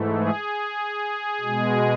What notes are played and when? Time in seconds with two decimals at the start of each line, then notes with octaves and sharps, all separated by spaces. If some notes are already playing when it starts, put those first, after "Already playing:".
Already playing: G#2 E3 A3
0.13 G#4
1.41 B2 G#3